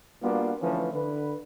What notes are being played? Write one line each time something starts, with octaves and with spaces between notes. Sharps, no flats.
G3 A#3 B3 D4 F4 F#4
D3 E3 F3 A3 C#4 B4
D3 B4